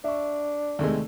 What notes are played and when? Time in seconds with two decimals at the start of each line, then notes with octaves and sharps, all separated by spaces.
0.04 D4 E5 C#6
0.79 D#2 C3 G#3 A3 D5